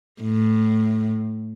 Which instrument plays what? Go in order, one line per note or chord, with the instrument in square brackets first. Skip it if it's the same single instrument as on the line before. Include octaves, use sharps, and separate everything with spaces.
[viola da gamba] A2